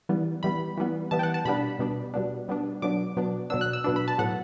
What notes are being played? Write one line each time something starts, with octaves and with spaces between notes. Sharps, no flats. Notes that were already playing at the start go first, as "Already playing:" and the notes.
E3 G3 B3
E3 G3 B3 B5
E3 G3 B3
E3 G3 B3 A5
G5
F#5
A5
B2 G3 B3 D4 B5
B2 G3 B3 D4
B2 G3 B3 D4
B2 G3 B3 D4
B2 F#3 B3 D4 D6
B2 F#3 B3 D4
B2 F#3 B3 D4 E6
F#6
E6
B2 F#3 B3 D4
B5
A5
A2 F#3 B3 F#5